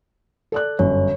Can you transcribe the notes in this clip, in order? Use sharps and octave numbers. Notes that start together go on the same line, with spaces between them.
A4 D5 F#6
G1 F#2 C#5